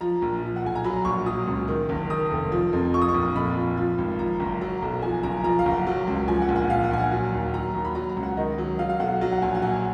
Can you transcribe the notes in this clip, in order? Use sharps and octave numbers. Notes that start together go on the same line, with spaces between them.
F3 A#5
A#1
F3
F#5
B1 G#5
A#5
F#3 B5
A#1 C#6
F#3 D#6
C#2
D#3
F#1
D#3 D#6
F1
F3
F2
F3 C#6
D#6
C#6
A#1
F2 B5
F3
F3
G#1
F3 A#5
F#1
F#3 A#5
B1
F3 G#5
F#1 A#5
F3 A#5
F5
F#1
F#5
F#3
C#2
F3 G#5
F#5
A#1
F#5
F3 F5
F#5
A#1 G#5
F#5
F#3
D#2
F#3 A#5
D#2
B5
F#3 A#5
A#5
C#2
F#5
D#3 D#5
F#3
F#3 F5
F5
B1 F#5
F#3
F#5
A#1 G#5
F#5
F#3 G#5